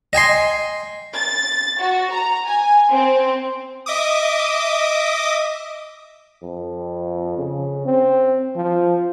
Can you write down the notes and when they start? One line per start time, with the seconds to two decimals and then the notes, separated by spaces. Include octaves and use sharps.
0.13 D#5 G5 G#5 C6
1.14 A6
1.80 F#4
2.11 A#5
2.45 G#5
2.91 C4
3.86 D#5 E5 D6 D#6
6.42 F2
7.37 C#3
7.86 C4
8.56 F3